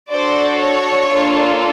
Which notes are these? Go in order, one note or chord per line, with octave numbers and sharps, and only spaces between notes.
D4 F#4 A4 C5 D5
C#5
A#3 D4 F4 A4